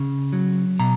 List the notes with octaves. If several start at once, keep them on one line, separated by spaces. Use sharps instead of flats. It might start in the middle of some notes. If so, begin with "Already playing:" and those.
Already playing: C#3
F#3
B2 A#5